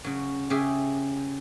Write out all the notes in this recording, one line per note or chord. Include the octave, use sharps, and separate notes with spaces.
C#3 F#3
C#3 G4 G#4 E5